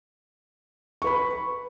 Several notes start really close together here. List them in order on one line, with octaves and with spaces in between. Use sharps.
C#6 B4 B5